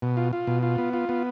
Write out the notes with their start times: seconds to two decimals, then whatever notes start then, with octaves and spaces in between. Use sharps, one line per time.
0.02 B2
0.17 F4
0.33 F4
0.47 B2
0.63 F4
0.78 B3
0.94 F4
1.09 B3